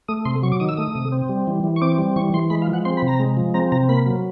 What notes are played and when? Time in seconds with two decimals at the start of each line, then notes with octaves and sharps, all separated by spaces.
0.08 A3 D#6
0.25 C3 C6
0.43 F#3 C#6
0.52 D6
0.60 D#3 D#6
0.69 E6
0.77 A3 D#6
0.95 C3
1.12 C4
1.29 G3
1.47 E3
1.64 E3
1.76 C#6
1.82 C4 D6
1.98 G3
2.16 E3 C#6
2.34 E3 C6
2.50 G#3 B5
2.62 F5
2.67 F3
2.73 F#5
2.85 C4 C6
2.97 B5
3.02 C3
3.08 A#5
3.20 G#3
3.37 F3
3.54 C4 A#5
3.72 C3 A#5
3.89 A#3 B5
4.06 F#3